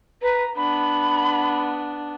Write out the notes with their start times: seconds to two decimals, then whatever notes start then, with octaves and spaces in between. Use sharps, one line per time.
0.22 B4 A#5
0.57 B3 D4 B5